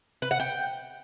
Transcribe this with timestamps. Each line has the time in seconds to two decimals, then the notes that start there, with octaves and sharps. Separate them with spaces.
0.22 B4
0.31 F#5
0.40 G5